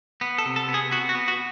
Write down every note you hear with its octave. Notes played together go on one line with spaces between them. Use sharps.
B3
A4
C3
A4
B3
G#4
B3 F#4
F#4
B3
F#4